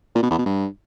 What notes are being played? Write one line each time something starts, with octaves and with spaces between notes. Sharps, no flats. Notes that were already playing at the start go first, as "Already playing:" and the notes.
A#2
B2
E2
B2
G2